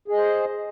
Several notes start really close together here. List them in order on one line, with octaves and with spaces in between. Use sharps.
G#4 D#5 C5